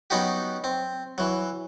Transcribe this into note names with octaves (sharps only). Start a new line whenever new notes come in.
F#3 B3 C#4 D#4 F#4 G4
C4
E3 F#3